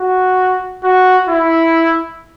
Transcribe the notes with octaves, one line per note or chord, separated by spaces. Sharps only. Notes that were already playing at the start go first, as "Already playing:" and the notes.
Already playing: F#4
F#4
E4